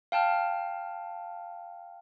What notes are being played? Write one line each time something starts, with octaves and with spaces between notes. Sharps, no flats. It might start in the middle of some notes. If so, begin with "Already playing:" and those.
F5 G5 A5 F6